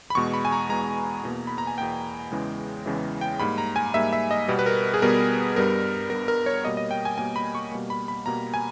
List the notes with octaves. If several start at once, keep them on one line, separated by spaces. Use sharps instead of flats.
B5
E2 B2 G#3 C#6
B5
G#5
A#5
E2 B2 G#3 A#5
E2 B2 A#3
B5
A#5
G#5
E2 B2 A#3 G5
E2 C#3 E3 G#3
E2 C#3 E3 G#3
G5
G#2 G3 A#3 B5
A#5
G#5
G#2 G3 A#3 E5
E5
D#5
B2 G3 B3
B4
A#4
G#4
B2 G3 B3 A#4
G2 G3 B3 A#4
G2 G3 B3 A#4
A#4
C#5
B2 G3 A#3 D#5
D#5
G5
G#5
B2 G3 A#3 G#5
B5
C#6
B2 G3 A#3
B5
B5
B2 G3 A#3 A#5
G#5